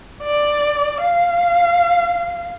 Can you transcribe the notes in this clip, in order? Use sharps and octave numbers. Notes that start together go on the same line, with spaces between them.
D5
F5